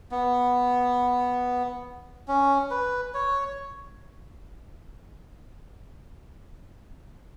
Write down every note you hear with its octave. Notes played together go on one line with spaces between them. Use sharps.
B3
C#4
B4
C#5